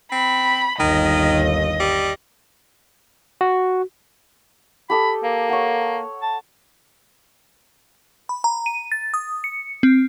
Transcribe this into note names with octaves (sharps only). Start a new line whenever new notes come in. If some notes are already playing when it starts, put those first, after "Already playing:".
C4 B5
G1 D#2 D#3 D#5
G3
F#4
G4 A4 B5 D#6
A#3
C#5 F#5
A5
B5
A#5
D#7
A6
D#6
C#7
C4